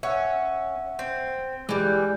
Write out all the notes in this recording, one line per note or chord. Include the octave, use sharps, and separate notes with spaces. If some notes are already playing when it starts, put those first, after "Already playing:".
C#4 E5 F#5 E6
C4
E3 G3 G#3